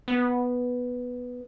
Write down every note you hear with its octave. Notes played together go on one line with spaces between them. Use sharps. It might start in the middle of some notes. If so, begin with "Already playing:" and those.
B3